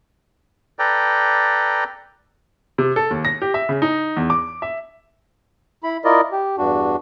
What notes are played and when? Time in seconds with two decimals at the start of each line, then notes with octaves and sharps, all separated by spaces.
0.79 A4 B4 D5 G5 A#5
2.78 C3
2.96 A4
3.11 D#2
3.25 A#6
3.42 G4
3.54 E5
3.69 C#3
3.82 D#4
4.17 E2
4.30 D6
4.62 E5
5.84 E4 B5
6.05 E4 F4 A#4 D5 D#5
6.32 G4
6.58 E2 G2 D4 F#4